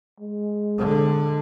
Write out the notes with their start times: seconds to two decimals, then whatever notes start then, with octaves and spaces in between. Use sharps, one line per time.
0.20 G#3
0.78 D3